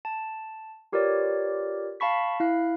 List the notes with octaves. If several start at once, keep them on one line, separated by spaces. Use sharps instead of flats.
A5
F4 G4 A#4 B4 C#5 D5
F5 A5 B5 C#6 B6
E4 F5 F#6